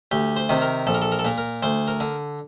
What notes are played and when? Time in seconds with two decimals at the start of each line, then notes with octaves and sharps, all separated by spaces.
0.11 D2 G4
0.36 C5
0.49 C3 D#3
0.62 A#4
0.87 A#1 A4
0.94 A#4
1.02 A4
1.12 A#4
1.19 A4
1.25 A#2 A#4
1.38 A#4
1.62 D2 C5
1.88 A#4
2.00 D3